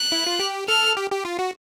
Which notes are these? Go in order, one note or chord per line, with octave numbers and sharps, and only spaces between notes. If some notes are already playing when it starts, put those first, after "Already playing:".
Already playing: F#6
E4
F4
G4
A4 F6
G4
G4
F4
F#4